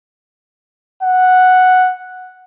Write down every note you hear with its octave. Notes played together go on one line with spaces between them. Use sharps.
F#5